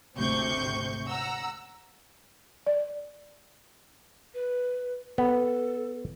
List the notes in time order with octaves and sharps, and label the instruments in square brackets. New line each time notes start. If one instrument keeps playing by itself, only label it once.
[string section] G#1 D2 C3 C5 C#6 G6
F#5 A#5 E6
[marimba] D5
[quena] B4
[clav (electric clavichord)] B3 [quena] A4